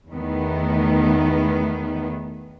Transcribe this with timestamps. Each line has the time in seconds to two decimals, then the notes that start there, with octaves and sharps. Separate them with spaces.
0.10 E2 D#3 A3 B3